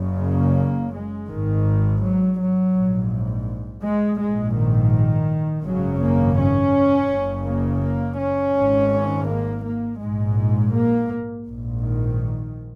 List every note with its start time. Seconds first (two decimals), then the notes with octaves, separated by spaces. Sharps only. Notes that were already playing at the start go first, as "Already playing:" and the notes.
Already playing: F#1 F#2 C#3
0.19 A#3
0.93 G#3
1.28 G#1 G#2 D#3
2.02 F#3
2.39 F#3
2.74 A#1 G#2
3.83 G#3
4.20 A#1 G#2 G#3
4.56 D#3
5.64 G#1 F#2 C#3 F#3
6.01 A#3
6.38 C#4
7.10 F#1 F#2 C#3
7.47 A#3
7.82 A#3
8.19 C#4
8.56 G#1 G#2
9.29 A#3
9.65 A#3
10.00 A#1 G#2 G#3
10.74 A#3
11.46 A#1 G#2
11.83 D#3